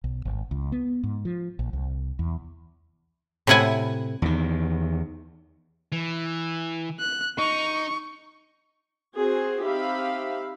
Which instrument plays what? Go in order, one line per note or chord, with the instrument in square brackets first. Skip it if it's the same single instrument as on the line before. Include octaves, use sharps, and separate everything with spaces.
[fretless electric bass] B1
G#1
C#2
B3
G#2
F3
A#1
C2
E2
[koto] A2 C3 E4 F#5 G#5
[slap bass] E2 D#3
[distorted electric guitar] E3
[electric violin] F#6
[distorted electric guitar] D#4 [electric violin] C#6
[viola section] C4 F#4 G#4 C5
C4 D#4 G4 E5 F5 B5